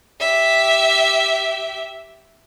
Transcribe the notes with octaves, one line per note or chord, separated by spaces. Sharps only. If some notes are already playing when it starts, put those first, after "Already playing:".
G4 E5